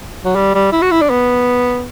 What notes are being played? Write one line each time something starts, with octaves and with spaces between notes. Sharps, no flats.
F#3
G3
G3
E4
F#4
E4
D4
B3